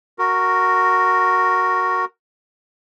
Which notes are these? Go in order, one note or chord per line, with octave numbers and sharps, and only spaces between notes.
F#4 A#4